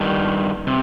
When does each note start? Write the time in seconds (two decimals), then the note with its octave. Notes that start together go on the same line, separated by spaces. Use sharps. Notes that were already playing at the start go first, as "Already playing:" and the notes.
Already playing: G2 D#3
0.67 C3